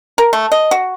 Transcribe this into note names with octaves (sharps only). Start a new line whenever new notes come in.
A#4
A3
D#5
F#4